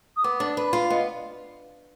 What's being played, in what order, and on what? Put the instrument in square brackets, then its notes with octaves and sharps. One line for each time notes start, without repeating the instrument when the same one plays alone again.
[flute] D#6
[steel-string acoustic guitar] B3 [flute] D6
[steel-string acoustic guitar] D4
B4
[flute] B5
[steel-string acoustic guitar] F4 [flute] C6
[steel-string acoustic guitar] B3 [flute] D#5